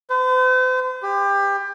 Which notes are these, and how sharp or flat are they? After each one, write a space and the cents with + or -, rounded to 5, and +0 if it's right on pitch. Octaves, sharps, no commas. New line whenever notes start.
C5 -45
G4 +25